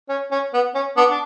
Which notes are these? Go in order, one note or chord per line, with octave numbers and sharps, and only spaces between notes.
C#4
C#4
B3
C#4
B3 D4
D4